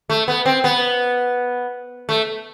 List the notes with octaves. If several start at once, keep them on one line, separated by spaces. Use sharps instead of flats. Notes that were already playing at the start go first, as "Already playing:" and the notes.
A3
B3
C4
B3
A3